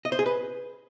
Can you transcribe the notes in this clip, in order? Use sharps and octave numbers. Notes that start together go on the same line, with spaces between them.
D#5
C5
G#4
B4